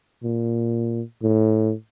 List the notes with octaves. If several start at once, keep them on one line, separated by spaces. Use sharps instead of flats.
A#2
A2